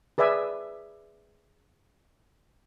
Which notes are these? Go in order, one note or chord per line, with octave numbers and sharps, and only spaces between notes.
G#4 B4 D5 E5 G#5